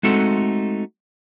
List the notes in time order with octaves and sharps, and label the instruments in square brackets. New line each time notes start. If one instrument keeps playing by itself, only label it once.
[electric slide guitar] G#3 A3 C4 D#4 F#4 A4